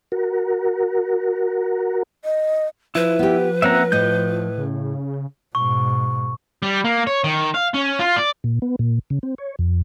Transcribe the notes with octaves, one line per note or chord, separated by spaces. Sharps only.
F#4 A#4
D#5
F3 E4 B4
B3 G4
A#3 C4 C#4 E5 F#5 A#5
A2 D#5 G6
C#3
G#2 B2 C#6
G3
A#3
C#5
D#3
F5
C#4
F4
D5
A#2
B3
A#2
C#3
C4
C#5
F2